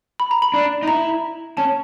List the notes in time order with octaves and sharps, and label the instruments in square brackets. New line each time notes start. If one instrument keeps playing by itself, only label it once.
[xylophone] B5
A#5
B5
[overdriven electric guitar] D4
D#4
[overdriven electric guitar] E4 [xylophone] A#5
[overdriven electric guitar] C#4 [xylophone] A5